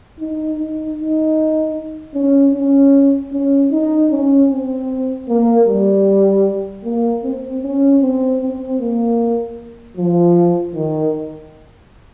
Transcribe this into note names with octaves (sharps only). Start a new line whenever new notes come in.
D#4
D#4
D#4
C#4
C#4
C#4
D#4
C#4
C4
A#3
G3
A#3
C4
C#4
C4
C4
A#3
F3
D#3